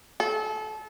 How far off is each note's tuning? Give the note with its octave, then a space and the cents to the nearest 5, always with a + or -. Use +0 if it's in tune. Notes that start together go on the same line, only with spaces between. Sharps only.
A4 -30